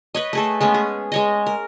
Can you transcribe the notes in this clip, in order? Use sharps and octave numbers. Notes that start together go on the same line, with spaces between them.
B4 C#5 D#5
A3 G#4 A4
G#3 A3 B3 C#4
G#4
G#3 C#5 D#5
A#4